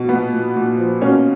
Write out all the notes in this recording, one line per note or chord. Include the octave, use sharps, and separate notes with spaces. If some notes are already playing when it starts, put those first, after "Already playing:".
Already playing: B2
A#2 B3
A#2
A#2
F3
B2 A#3 C#4